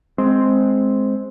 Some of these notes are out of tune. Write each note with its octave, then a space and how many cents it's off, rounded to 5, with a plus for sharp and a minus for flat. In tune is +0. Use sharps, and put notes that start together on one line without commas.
G#3 +10 C4 +0